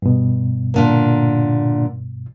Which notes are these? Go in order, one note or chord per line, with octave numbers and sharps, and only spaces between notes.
G2 B2
A#2 D3 A#3